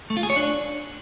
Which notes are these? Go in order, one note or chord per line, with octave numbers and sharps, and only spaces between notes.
A3
F4
G#4
C#5
D4